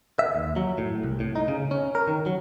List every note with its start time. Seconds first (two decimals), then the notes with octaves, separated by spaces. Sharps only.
0.19 E5
0.35 D#2
0.56 F#3
0.78 A2
1.03 C2
1.20 A2
1.36 D#4
1.48 C#3
1.71 C#4
1.95 A#4
2.07 D#3
2.26 F#3